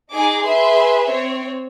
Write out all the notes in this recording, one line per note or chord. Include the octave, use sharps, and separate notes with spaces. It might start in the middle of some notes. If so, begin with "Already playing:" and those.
D#4 G#4 D6
G#4 B4 E5 C6
C4 C#5